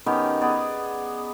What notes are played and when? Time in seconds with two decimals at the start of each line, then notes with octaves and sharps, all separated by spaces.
0.06 D#3 B3 C#4 G4
0.41 B3 G#4 D5